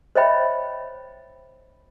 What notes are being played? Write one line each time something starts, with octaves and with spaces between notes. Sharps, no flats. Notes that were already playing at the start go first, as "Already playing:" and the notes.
C5 C#5 D#5 E5 G5 B5